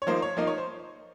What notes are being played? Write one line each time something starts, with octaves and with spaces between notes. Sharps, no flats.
C#5
F3 A#3 D#4 C5
C#5
F3 A#3 D#4 D#5
C#5
C5